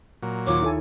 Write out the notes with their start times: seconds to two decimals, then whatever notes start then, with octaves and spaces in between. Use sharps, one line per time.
0.22 A#2 F#3
0.47 D#2 F4 C#5 D6
0.62 E4 A4 G#5